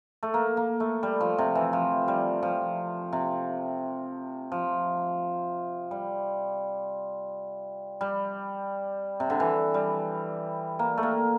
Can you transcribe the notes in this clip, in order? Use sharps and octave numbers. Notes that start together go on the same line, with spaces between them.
A3
A#3
A#3
A3
G3
F3
C3
E3
F3
G3
F3
C3
F3
G3
G3
C3
D3
E3
G3
A#3
A3
A#3